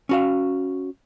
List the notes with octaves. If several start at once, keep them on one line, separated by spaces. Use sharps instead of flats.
C#4 F#4 F5